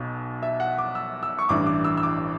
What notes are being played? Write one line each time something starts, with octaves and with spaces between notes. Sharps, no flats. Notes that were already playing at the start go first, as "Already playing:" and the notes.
Already playing: B1 B2
E5
F#5
D6
E6
E6
C#6
A1 G2 E3 D6
D6
E6
E6
D6